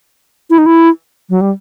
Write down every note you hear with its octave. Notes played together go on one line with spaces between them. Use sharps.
E4
D#4
E4
F#3
G3